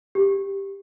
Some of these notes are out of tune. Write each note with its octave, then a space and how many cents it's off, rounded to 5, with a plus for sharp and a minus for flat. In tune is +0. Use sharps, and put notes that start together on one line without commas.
G4 +5